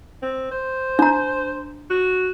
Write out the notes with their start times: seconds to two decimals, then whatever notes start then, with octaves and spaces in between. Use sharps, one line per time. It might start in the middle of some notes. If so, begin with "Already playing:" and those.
0.23 C4
0.51 C5
0.99 D4 A#5
1.90 F#4